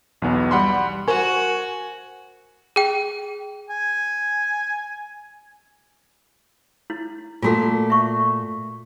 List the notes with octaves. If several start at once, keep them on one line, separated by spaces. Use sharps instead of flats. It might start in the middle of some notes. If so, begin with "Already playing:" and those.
B1 E2 B3
G3 F#5 B5 C6
F#4 A#4 C5 G#5 C#6
G#4 G5
G#5
E4
A#2 A3 A#3 F4 F#4 A4
E5 C#6